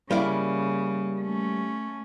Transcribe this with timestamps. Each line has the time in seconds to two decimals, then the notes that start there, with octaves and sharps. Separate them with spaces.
0.11 C#3 G3 A#3 E4
1.19 A3 C#4